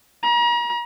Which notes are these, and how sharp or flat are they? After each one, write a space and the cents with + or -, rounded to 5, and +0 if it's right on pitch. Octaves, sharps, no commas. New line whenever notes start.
A#5 +40